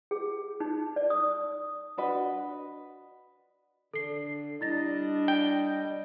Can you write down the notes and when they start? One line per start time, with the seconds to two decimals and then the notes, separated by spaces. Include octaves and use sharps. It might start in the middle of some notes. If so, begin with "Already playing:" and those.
0.11 G#4
0.60 D#4
0.96 D5
1.10 D#6
1.97 D4 F#4 B4 D#5
3.93 D3 A4 C7
4.61 G3 D4 E4 D#5 A6 A#6
5.28 G5